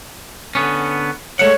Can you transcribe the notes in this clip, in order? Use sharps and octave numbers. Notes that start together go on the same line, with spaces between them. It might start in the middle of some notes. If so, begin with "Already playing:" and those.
D3 B3 C#4
G#3 A3 C#5 F#5